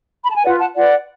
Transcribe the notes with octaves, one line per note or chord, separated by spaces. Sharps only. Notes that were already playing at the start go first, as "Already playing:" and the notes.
B5
A5
G#5
F4 B4 D5 F#5
F#5 A5
F4 B4 D5 F#5